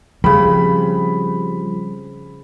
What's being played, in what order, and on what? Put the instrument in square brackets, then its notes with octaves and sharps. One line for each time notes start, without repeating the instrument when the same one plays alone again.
[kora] C#3 C4 [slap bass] F3 G3 [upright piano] B5